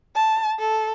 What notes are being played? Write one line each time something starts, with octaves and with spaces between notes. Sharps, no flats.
A5
A4